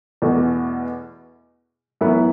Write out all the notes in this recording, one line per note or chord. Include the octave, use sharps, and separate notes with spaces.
E2 B2 A3
F#2 E3 B3 E4 B4